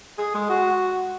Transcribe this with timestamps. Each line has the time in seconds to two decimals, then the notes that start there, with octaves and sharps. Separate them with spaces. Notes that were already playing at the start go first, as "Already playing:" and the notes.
0.18 G#4
0.34 G#3
0.49 F#4